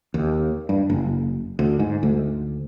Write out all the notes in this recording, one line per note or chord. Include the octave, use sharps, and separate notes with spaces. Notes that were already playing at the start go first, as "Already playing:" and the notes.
D#2
G2
F#1
D2
G#2
D2